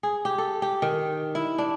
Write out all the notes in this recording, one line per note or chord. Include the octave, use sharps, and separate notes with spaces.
G#4
G4
A4
G4
D#3
E4
D4